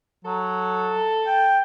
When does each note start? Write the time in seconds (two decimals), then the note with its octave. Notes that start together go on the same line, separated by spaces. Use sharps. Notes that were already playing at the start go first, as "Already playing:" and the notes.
0.25 F#3 A4
1.27 G5